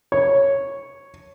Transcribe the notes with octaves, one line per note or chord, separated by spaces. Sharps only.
C#5